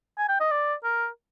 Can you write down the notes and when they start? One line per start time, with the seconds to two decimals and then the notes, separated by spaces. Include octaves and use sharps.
0.18 G#5
0.29 G5
0.40 D#5
0.51 D5
0.84 A#4